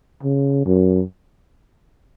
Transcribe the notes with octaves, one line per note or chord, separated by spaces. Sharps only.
C#3
F#2